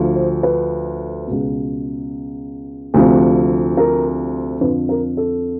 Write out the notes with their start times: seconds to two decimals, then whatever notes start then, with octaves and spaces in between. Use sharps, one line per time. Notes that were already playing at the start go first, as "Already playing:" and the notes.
Already playing: D2 D3 F3
0.16 C5
0.43 B4
1.27 C#2 B2
2.94 D2 C3 F3
3.77 A#4
4.61 F2 D3 F3 B4
4.89 A#4
5.17 A4